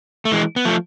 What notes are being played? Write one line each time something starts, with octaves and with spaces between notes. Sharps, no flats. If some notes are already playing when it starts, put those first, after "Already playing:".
A3
E3 G#3
B3
F3 A3